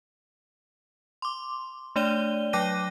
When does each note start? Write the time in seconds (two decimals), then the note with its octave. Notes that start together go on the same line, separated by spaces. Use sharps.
1.22 C6 D6
1.96 A3 D4 C#5 D5 D#7 G7
2.53 F#3 G5 D6 F#6 A#6 D#7